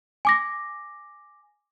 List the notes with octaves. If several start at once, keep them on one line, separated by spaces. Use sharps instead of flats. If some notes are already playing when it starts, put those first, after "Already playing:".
G#5 D6 A#6